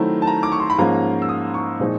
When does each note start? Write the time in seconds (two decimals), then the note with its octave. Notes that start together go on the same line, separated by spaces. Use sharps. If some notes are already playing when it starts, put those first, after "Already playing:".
Already playing: D#3 F#3 A3 C4 E4 A#5
0.22 A5
0.27 A#5
0.43 D6
0.52 C#6
0.60 C6
0.70 B5
0.78 G#2 F3 A#3 C#4 F4 A#5
1.22 E6
1.29 D#6
1.54 C#6
1.80 A#2 F3 G#3 C4 D#4